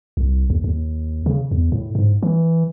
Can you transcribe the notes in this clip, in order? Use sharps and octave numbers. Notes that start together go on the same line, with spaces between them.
C2
D#2
D#2
C#3
E2
A2
G#2
E3